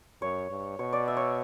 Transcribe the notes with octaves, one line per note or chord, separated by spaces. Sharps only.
F#2 C#5
G2
B2 C#5
D5
E5
C#5